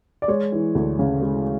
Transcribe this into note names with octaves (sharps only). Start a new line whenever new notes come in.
D5
G#3 C#5
E3
D2
C#3
G#3